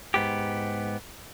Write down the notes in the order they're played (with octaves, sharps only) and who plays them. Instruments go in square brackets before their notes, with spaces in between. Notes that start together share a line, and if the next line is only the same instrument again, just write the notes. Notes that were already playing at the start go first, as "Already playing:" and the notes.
[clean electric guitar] G#2 B3 G4